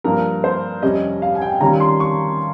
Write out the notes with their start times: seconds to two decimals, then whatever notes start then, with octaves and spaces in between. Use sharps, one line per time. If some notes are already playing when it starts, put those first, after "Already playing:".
0.04 G2 F3 A#3 A#4
0.44 C5
0.83 F2 C3 G3 C#4 D#5
1.22 F5
1.35 G#5
1.42 G5
1.61 D#3 G3 C#4 F4 A#5
1.80 C6
2.00 C#6